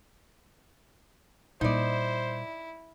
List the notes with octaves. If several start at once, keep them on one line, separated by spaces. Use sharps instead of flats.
A#2 G3 D#4 E4 C5 D5